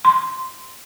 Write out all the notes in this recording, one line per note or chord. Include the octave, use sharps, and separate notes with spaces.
C6